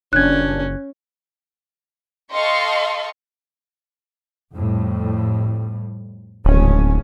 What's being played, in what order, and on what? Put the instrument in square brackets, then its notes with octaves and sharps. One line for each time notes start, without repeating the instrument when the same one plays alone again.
[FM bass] F#1 [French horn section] G2 A#2 D4 [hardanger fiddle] C#4 [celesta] F#6 G#6
[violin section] A4 D#5 F5 G5 C6 C#6
[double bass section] F2 A2 G3
[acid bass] D1 [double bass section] G#1 C#3 C#4